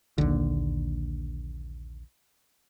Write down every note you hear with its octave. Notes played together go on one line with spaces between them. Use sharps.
A#1 D#2 D3